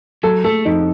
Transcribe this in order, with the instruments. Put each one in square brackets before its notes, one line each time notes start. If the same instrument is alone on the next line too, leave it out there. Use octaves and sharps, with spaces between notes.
[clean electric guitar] F#3 [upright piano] A4
[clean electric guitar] A3 [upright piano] A4
[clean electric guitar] F2 [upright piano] D#4